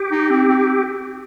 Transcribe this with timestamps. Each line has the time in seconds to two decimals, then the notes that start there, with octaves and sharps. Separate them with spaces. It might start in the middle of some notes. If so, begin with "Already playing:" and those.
Already playing: G4
0.11 D#4
0.30 C4
0.49 C4